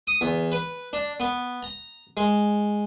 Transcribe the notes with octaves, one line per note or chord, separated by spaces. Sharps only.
D#6
E2
B4
D4
B3
A#5
G#3